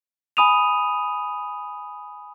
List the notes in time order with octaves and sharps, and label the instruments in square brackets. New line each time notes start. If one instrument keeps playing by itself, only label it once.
[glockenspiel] G#5 B5 D#6 D#7 F7